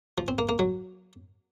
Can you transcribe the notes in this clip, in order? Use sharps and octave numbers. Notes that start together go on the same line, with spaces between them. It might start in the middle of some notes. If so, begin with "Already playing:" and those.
F3
C4
A#3
A#3
F#3